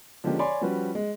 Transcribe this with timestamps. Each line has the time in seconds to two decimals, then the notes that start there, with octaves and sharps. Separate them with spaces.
0.24 D3 F3 G#3 A#3 C#4 G4
0.39 C#5 D5 G#5 B5 C6
0.61 F3 G3 C#4 F#4 B4
0.95 G#3